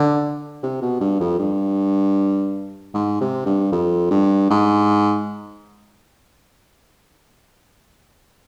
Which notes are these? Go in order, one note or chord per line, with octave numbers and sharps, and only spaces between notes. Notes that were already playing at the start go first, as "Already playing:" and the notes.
Already playing: D3
C3
B2
G2
F2
G2
G#2
C3
G2
F2
G2
G#2